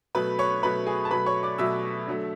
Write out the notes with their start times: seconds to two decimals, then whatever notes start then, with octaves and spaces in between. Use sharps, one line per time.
0.15 B2 F#3 A3 B4 B5
0.39 C#5 C#6
0.63 B2 F#3 A3 B4 B5
0.86 G#4 G#5
1.05 A5
1.11 B2 F#3 A3 B4 B5
1.26 C#5 C#6
1.43 D5 D6
1.58 B2 F#3 A3 E5 E6
2.07 D3 F#3 A3